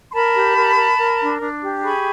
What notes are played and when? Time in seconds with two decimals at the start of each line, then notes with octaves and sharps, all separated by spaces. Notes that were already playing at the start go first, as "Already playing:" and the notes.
0.10 C6
0.13 A#4 A5 B5
0.34 G4
0.56 A#4
0.78 A#4
0.98 A#4
1.20 D4
1.41 D4
1.62 G4
1.83 G#4 B5 C#6